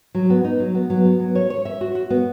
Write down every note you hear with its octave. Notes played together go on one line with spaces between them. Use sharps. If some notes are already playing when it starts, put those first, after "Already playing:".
F#3
B3
D#4
F#3
B3
F#3
B3
F#3
C#5
C#5
E5
F#4
F#4
B3